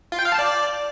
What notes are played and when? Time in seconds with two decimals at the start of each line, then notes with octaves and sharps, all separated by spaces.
0.12 F4
0.19 G5
0.25 F5
0.32 A5
0.39 D5